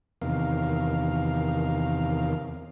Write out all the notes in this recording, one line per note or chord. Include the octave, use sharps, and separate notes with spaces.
E2 C3 D#3 A#4 F5